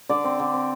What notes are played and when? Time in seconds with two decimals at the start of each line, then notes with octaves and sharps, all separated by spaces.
0.09 D3 D5
0.24 C4
0.40 D3
0.54 C4